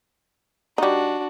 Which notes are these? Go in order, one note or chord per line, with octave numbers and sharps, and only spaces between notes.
G3 D4 D#4 F#4